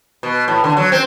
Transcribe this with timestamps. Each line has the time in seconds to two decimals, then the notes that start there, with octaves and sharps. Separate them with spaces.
0.23 B2
0.48 A2
0.64 D3
0.77 F#3
0.92 C4